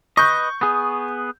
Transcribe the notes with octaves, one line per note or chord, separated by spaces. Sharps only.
B4 D#5 C#6 G6
B3 G#4